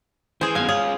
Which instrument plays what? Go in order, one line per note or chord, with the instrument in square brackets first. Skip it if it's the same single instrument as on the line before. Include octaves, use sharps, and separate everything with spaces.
[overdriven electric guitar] E3 [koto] G#4 C5
[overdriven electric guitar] F#2 B2 [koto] F5 G#5
[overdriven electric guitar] C#4 F4 [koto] G#4